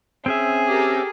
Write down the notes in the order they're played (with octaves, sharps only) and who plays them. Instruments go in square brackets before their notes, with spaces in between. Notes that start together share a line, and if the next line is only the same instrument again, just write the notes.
[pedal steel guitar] C4 C#4 E5 [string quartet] G#4
[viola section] G4 A4 A#4